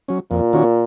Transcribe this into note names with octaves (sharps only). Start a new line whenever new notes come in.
F#3 C#4
F2 A#2
D#3 A#3 C#4 F#4